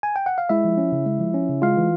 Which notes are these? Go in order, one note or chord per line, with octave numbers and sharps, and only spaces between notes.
G#5
G5
F#5
F5
G#3 E4 E5
F3
C#4
C#3
G#3
F3
C#4
C#3
G#3 F4 F5
E3